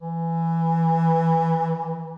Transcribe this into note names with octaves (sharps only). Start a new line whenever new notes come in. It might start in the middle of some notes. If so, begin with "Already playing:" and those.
E3